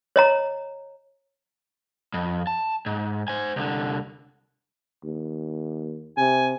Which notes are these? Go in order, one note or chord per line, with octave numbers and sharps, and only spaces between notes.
C#5 D#5 A#5
F2
A5
G#2
C5 G#5
C2 D3
D#2
C3 G#5